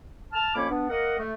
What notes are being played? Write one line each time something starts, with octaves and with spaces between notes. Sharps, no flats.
A5 F6
F2 A#3 C#4 C#5 B5 D6
B3 D4
A#3 A#4 D#5 F#5
A3